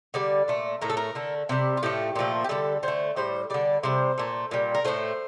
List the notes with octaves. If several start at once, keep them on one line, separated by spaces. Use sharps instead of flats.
D3 G3 D5
A#2 A3
A2 A3 A#4
A4
A#4
D3 A3
C3 G3 G4
F4
A2 F3 A3 G4
A#2 F3 A3
G4
D3 G3 A4
D3 A3 C5
A2 G3 C5
D3 G3 D5
C3 G3 C5
A#2 A3
A#2 G3
A#4
A2 F3 A3 C5